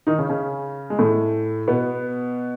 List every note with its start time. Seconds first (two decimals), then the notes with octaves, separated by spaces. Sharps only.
0.07 D#3 D#4
0.19 C#3 C#4
0.29 C#3 C#4
0.90 G#3
0.99 A2 A3
1.68 B2 B3